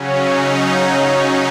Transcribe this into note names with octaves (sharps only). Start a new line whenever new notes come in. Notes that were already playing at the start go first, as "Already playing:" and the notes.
Already playing: C#3 F#3 C#4
D#4
D#4